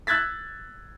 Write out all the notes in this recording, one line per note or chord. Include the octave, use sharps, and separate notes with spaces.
E6 F#6 G#6 A6 B6